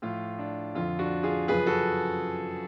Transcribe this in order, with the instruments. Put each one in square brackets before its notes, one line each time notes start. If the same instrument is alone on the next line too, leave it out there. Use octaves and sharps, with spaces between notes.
[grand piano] A2 F3 F4
D4
F2 D3 F3 F4
D4 F#4
F4 G#4
F#2 C#3 F3 G#4 B4
F#4 A4